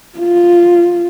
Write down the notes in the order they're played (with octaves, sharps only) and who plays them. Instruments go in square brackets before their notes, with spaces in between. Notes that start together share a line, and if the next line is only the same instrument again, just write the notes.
[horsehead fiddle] F4